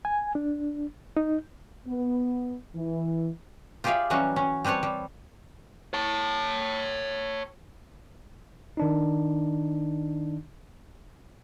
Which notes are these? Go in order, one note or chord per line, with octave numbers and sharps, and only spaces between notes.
G#5
D4
D#4
B3
E3
F4 G4 G#4 D5 E5 F5
E3 F#3 G3 C#4 F#4
C#4
G3 C4 B4 C#5 A5
G3
C#5 A5
D#3 D4 D#4